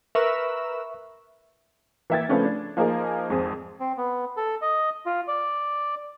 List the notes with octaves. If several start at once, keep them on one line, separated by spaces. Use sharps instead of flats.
A#4 B4 E5 C#6 E6
E3 A#3 E5 G5 G#6 A6
C#3 F3 A3 B3 C#4 D4
D4
F3 A#3 D#4 G#4 A#4
G#1 F2 C4 G#4 D#6
C4
B3
A4
D#5
F4
D5